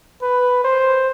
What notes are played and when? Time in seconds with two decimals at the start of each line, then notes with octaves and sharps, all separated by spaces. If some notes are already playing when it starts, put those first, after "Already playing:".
0.22 B4
0.64 C5